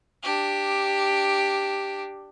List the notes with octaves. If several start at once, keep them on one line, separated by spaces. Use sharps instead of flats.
D4 G4